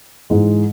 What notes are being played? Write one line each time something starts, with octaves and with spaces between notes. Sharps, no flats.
G#2 E3 G#3